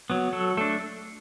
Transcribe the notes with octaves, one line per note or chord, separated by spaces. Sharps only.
F#3 B3
F#3 A4
A3 D4 A4